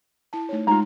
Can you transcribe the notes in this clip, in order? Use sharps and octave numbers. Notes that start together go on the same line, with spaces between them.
E4 A5
A3 D#4 C#5
G#3 D#4 F4 A#5